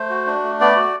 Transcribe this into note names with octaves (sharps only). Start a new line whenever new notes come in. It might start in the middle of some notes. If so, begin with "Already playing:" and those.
Already playing: A3 C5
F#4
D4
A3
B3 D5
F#4